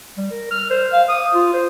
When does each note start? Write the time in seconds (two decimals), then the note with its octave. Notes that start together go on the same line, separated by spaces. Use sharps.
0.18 G3
0.31 A#4
0.51 F6
0.71 C5
0.93 F5
1.09 D#6
1.35 F4
1.54 C5